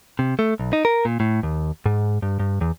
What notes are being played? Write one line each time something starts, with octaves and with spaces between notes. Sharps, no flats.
C3
A3
B1
D#4
A#4
A#2
A2
D#2
G#2
G2
G2
E2